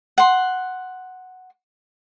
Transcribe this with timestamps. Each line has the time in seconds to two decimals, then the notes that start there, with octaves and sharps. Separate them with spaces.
0.18 F#5 C6